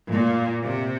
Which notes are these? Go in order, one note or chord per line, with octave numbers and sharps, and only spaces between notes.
A#2
C3